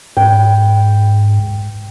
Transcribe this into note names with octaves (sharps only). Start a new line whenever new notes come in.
G#2 G5